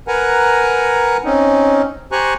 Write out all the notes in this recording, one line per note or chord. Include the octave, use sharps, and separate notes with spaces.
A#4 B4 F#5 G#5 A#5
C4 C#4 D#4
G4 C5 G#5 A#5 C#6 F#6